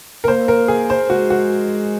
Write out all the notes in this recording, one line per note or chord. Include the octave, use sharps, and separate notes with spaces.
A#4
A#3 C5
A#4
G#4
C5
G#3 F#4
F#4